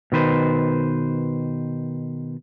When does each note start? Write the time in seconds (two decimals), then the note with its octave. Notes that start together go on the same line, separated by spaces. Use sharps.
0.12 B2 D#3 B4 C5